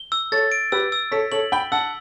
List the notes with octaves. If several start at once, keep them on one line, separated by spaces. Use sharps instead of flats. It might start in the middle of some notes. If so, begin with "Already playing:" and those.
Already playing: G7
E6
A4 C#5 A6
D7
G4 B4 E6
E6
A4 C#5 B6
A4 C#5 F#7
G5 B5 G7
F#5 A5 E6